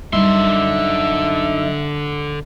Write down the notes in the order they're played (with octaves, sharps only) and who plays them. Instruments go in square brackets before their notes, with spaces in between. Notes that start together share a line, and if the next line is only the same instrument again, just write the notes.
[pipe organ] F#2 D#4 [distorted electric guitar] D3 C6 [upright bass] G3 [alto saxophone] E5